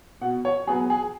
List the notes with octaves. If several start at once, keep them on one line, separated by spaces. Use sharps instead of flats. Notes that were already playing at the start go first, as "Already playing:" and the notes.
B2 F#5
C#5
F#3 B3 G#4
G#4